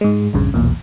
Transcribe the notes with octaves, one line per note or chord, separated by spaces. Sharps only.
G#2 G#3
A#1 E2 G2 C#3
B1 E2 A#2